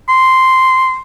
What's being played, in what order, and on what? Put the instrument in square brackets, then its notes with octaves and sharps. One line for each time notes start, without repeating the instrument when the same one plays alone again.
[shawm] C6